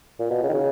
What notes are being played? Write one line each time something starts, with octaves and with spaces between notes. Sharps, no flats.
A#2
B2
C#3
D#3
C#3